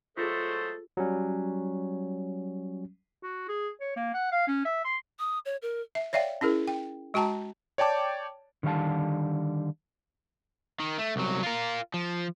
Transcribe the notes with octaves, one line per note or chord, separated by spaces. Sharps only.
F#3 G#3 A3 F4 G#4 A4 C5
F#3 G3 C#4
F#4
G#4
C#5
A#3
F#5
F5
C#4
E5
C6
D#6
C#5
A#4
E5
C#5 D5 E5 F5 G5
C#4 E4 G#4 A#4
G5
G#3 F#4 G5 A5 A#5
C#5 D5 G5 A5 D6
D3 D#3 G3 C#5 F5 A5
D#3
A3
C2 F#3
F4 A#4
F3